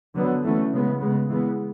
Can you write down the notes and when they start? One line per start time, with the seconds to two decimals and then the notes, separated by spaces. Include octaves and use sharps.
0.15 D3 F#3 B3
0.44 E3 A3 C#4
0.72 C#3 G#3 B3
1.01 C#3 G#3 B3
1.29 E3 G#3 B3